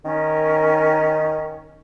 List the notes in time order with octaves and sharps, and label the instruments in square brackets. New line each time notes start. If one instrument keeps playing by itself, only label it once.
[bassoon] D#3 [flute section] C#4 A#4